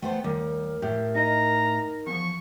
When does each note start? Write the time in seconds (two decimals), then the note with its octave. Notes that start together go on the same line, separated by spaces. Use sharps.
0.02 A3 B3 C5 G5
0.24 D#2 G3 A#4
0.82 A2 G4
1.15 D#4 D#5 A#5
2.07 E2 F3 C#6